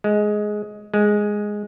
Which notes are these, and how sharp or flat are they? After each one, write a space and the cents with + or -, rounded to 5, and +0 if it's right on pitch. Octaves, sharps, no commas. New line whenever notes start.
G#3 +10
G#3 +0